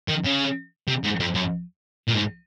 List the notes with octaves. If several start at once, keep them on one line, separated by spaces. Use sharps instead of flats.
D#3
C#3
C3
G#2
F2
F#2
A#2
G#2